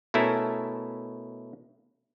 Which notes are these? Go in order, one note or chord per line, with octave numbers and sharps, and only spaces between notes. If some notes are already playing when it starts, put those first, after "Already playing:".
B2 A3 C#4 E4 A4 A#4